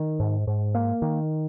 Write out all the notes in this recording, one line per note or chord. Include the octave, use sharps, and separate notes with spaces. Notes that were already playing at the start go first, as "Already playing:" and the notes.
Already playing: D#3
G#2
G#2
A#3
D#3